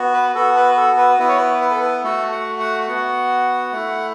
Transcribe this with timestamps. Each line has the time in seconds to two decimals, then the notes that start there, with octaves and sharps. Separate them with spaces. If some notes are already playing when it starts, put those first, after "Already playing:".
Already playing: B3 F#4
0.14 B4
0.35 B3 F#4 A4
0.56 B4
0.77 A4
0.98 B4
1.19 B3 E4 B4
1.29 C#5
1.38 B4
1.61 B4
1.71 A4
1.80 B4
2.04 A3 F#4 A4
2.32 F#5
2.60 F#5
2.88 B3 F#4 F#5
3.72 A3 E4